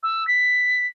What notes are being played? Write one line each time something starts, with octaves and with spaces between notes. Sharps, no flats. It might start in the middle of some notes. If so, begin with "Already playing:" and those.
E6
B6